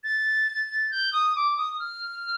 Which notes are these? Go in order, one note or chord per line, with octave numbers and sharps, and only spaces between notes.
A6
G6
D#6
D6
D#6
F6